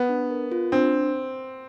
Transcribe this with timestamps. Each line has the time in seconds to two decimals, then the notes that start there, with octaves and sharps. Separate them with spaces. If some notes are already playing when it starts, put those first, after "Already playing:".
Already playing: B3
0.09 D4
0.31 A#4
0.52 F4
0.72 C4 D4